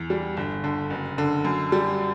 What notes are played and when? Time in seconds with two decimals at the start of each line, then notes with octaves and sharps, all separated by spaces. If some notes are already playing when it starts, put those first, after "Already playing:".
Already playing: E2
0.10 G3
0.37 G1
0.64 D3
0.90 F#1
1.18 D3
1.45 F#2
1.72 G3